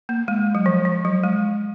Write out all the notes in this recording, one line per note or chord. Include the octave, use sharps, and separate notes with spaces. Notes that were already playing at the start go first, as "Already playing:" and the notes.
A#3
G#3
F#3
F3
F3
F#3
G#3